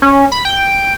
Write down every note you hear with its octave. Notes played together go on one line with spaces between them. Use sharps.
C#4
B5
G5